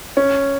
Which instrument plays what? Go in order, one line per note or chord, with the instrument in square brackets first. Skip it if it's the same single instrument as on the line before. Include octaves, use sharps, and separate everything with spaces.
[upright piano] C#4